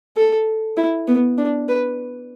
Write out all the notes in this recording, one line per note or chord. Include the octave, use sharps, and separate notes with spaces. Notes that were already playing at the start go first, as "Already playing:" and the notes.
A4
E4
B3
D4
B4